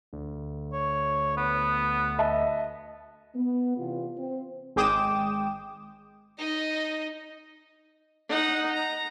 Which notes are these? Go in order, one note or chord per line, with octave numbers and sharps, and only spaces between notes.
D2
C#5
B3
D#5 E5 A5
B3
E2 C3 F4
C4
G#1 G#3 G5 D6 D#6 E7
D#4 D#5
D#4 F#5
A#5